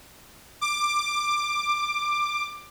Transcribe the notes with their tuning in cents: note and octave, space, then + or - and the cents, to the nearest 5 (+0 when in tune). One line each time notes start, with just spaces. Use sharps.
D6 +15